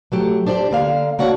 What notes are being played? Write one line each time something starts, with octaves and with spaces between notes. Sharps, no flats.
F#3 A3 G4
D4 G4 C5 D5
D3 A#3 F5
C#3 A#3 D4 F#4 C#5 F#5